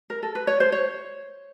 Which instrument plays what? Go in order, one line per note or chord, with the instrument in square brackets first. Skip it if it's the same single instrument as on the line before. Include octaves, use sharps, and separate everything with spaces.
[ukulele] A#4
A4
B4
C#5
C5
C#5